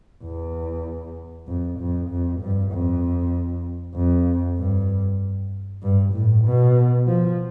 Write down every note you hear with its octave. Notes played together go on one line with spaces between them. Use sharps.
E2
F2
F2
F2
G2
F2
F2
G2
G2
A2
B2
F3